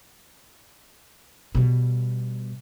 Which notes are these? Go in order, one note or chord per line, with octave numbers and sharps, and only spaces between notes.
B2 G3